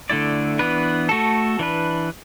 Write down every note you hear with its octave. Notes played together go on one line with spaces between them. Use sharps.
D3 A3 E4 D5
E3 B3 D4 B4
A3 F#4 A4
E3 D4 B4